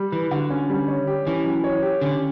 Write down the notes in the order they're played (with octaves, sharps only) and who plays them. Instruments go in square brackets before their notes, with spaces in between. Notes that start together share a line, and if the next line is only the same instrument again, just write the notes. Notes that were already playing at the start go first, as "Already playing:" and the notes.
Already playing: [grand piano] G3
[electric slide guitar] E3 [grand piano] B4
[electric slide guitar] D3 [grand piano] F#4
[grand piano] C#4
G3
C#5
G4
[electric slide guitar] E3 [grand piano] C#4
[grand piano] F#3
C#5
G4
[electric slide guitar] D3 [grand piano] C#4